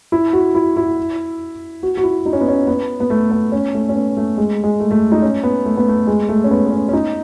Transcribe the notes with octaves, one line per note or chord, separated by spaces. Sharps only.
E4
F#4
E4
E4
F#4
F#4
E4
D#4
C#4
B3
C#4
B3
B3
A3
B3
C#4
A3
C#4
B3
A3
G#3
G#3
A3
A3
D#4
C#4
B3
A3
B3
A3
G#3
A3
C#4
B3
B3
C#4
C#4
D#4